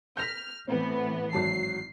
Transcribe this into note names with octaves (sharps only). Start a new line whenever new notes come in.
F6 G6 A#6 B6
A2 E3 B3 C4
G#1 F#3 A5 C7